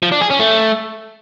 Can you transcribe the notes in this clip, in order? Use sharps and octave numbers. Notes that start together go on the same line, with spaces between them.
F3
D4
G#4
C#4
A3